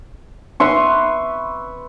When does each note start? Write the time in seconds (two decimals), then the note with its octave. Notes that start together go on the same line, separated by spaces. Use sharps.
0.60 B4 E5 C6 C#6